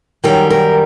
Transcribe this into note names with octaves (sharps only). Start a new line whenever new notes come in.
F#2 D#3 G3 A#4
A#4